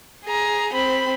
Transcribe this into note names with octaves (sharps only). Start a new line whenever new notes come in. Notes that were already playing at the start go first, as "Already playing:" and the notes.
G#4 A#5
C4 B5